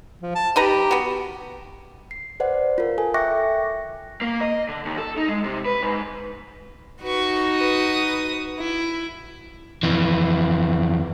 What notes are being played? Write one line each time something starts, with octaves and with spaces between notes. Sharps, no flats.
F3
A5
D#4 G4 B4 A#5
B3 F#4
C7
B4 C5 D5 F#5
F4 A#4
A4 G#5
E5 G5 C#6 D6 F#6 A#6
A#3
D#5
D3
D#2
A4
D#4
G#3
C3
B4
G#2
D#4 F#4 B4 C#6
B4 D#6
E4
F2 E3